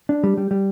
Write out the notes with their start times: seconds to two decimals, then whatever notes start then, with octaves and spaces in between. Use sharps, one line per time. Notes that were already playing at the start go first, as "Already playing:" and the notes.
0.09 D4
0.24 G3
0.38 G3
0.51 G3